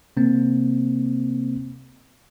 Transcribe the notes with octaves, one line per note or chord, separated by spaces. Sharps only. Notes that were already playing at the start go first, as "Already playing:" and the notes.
C3 A#3 C4